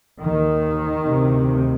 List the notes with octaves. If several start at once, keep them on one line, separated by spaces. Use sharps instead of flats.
D#2 D#3
D2 C3